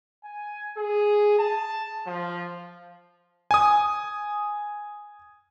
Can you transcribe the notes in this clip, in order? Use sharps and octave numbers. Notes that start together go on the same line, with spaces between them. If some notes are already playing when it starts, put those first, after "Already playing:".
G#5
G#4
A5
F3
G#5 D#6